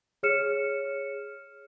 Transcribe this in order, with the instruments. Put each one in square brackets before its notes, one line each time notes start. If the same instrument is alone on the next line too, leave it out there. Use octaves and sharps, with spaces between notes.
[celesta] G#4 C#5 F6 C#7 E7